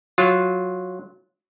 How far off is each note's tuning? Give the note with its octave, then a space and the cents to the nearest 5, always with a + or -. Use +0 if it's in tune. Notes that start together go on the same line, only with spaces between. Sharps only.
F#3 -10 F4 +0